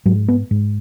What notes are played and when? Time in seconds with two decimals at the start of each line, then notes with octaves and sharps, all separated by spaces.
0.06 G#2 F#3
0.28 B3
0.51 G#2